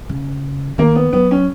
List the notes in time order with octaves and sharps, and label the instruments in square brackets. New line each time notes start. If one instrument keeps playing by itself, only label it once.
[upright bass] C#3
[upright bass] D#3 [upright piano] A#3
[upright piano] B3
[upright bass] F#3 [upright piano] B3
[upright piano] C#4